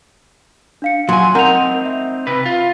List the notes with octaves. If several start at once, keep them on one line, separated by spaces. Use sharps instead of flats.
D4 F5 C#7
A#2 F#3 G#5 C6
C4 D#4 A#4 F#5 F7
E5
C3 B4
F4